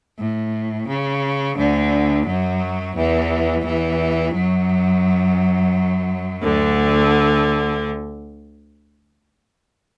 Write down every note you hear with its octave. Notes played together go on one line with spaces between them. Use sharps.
A2
C#3
D2 D3
F#2 F#3
E2 E3
E2 E3
F#2 F#3
D2 D3